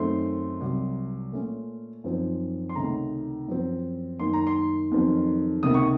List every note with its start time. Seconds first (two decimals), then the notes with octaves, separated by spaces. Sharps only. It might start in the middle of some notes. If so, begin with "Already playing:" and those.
Already playing: F#2 D#3 A3 C4 D#4 C6
0.61 C2 C3 F#3
1.32 A#2 A3 C#4
2.04 F#2 F3 C4 D#4
2.69 C6
2.75 C#2 C3 D#3 A3 C#4 A#5
3.48 F#2 F3 C4
4.19 F#2 D#3 A#3 D#4 C6
4.33 A#5
4.47 C6
4.92 F2 D#3 F#3 C4
5.63 C#2 C3 D#3 A#3 D#6
5.74 C#6